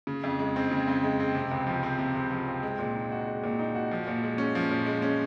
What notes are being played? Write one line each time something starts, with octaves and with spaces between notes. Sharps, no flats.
C#3
F2
G#3
C4
C#3
F2
G#3
C4
C3
C#2
F3
C4
C3
C#2
F3
C4
G#3
A#2
D#4
F#4
G#3
A#2
D#4
F#4
F3
A#2
G#3
C#4
F3
A#2
G#3
C#4